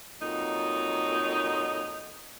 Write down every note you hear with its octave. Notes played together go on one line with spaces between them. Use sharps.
F2 A#2 F#3 D#4